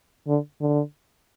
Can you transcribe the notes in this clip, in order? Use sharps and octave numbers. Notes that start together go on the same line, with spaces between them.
D3
D3